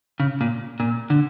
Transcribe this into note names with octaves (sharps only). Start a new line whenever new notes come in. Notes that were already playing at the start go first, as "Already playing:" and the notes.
C#3
A#2
A#2
D3